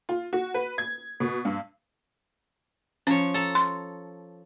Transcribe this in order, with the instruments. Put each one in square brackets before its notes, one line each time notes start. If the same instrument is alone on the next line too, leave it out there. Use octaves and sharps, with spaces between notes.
[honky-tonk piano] F4
F#4
B4
G#6
B2
G2
[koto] F3 C#5 [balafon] C#4
[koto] A4 A#5
[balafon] C6